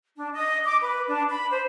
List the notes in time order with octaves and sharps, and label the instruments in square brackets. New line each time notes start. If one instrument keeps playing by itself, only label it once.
[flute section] D4
D#5
D6
B4
D4
B5
C5